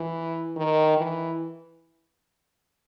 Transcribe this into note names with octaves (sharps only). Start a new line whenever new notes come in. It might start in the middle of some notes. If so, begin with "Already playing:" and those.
Already playing: E3
D#3
E3